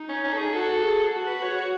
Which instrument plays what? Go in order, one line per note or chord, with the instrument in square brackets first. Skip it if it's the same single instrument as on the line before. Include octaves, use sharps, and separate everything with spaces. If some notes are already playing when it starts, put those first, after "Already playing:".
Already playing: [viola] D#4
[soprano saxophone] C#4
C#4
A4
G#4
[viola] F#4 [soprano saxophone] A4
[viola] G#4
F#4
[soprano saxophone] B4
C#5
C#5